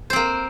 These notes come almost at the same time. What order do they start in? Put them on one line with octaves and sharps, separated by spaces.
C5 C4 A#3